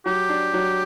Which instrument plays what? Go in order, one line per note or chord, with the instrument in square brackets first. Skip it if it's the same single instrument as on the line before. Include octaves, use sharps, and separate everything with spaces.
[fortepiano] F#3 [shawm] G4
[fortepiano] D4
F#3